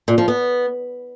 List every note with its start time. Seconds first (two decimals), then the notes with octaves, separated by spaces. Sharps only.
0.08 A#2
0.18 F3
0.28 B3